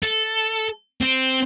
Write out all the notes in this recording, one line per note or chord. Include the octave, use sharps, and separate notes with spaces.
A4
C4